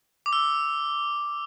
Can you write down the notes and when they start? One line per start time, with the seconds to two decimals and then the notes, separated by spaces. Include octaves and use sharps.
0.26 D6
0.33 E6